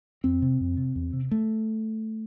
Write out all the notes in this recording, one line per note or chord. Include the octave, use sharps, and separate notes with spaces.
F2 C4
C3
F2
C3
E2
C3
A3